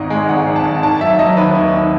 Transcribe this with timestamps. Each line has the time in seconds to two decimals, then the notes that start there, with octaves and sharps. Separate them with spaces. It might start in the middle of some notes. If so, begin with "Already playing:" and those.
Already playing: G#1 G#2 D#5
0.10 G#3
0.29 G#1 F#5
0.47 G#1
0.56 A5
0.65 G#1
0.83 D#3 A5
1.01 F#3 E5
1.19 F#3 D#5
1.37 D#2 B4
1.55 D#2
1.73 D#2